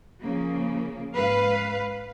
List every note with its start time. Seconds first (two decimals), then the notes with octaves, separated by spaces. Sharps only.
0.22 C#3 F3 A#3
1.13 G#2 B4 F5